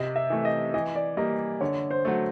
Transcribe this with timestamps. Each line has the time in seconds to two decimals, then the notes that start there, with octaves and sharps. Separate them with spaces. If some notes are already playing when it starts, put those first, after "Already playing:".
Already playing: C3 D#5
0.16 E5
0.30 E3 A3
0.45 D#5
0.74 E3 D#5
0.96 D5
1.17 G3 A#3 D#5
1.61 D3 C#5
1.91 C5
2.05 F#3 A3